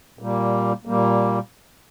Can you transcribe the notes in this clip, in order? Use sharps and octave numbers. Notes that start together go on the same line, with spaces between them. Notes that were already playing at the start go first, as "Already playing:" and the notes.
A#2 G3 A#3
A#2 G3 A#3